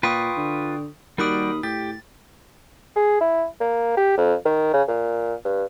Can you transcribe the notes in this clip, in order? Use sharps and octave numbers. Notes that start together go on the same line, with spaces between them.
A#2 F4 B4 G5 C#6 D#6
D3
D#2 G3 F#4 A#4 D5 B5 D#6
A2 G4 A6
G#4
E4
A#3
G4
F2
D#3
C#3
A#2
G2